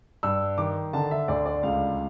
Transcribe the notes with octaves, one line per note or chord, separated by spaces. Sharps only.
G2 E6
D#3 D6
D3 A5
E5
D2 D5
D5
C#2 F5